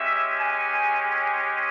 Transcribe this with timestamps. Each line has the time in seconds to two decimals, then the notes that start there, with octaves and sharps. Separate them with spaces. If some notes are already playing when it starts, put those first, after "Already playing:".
Already playing: G#3 C#4 G4 E5
0.40 G#5